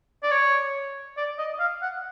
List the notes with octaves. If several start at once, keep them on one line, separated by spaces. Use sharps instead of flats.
D5
C#5
D5
D#5
F5
F#5